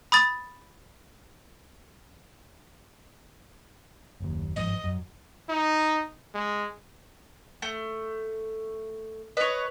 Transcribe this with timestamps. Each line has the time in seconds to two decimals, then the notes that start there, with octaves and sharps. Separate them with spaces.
0.12 B5 D#6 A6
4.20 F#1 D#2
4.56 G1 G#2 F3 D#5
4.84 F#2
5.49 D#4
6.35 G#3
7.62 A3
9.37 B4 C#5 D#5